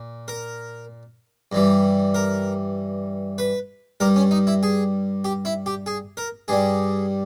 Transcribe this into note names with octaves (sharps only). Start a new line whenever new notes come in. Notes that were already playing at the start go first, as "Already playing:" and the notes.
Already playing: A#2
A#4
G2 E3 G3
A#4
B4
G2 G3 A#4
C#4
D#4
E4
G#4
G4
E4
G4
G#4
A#4
G2 G3 G#4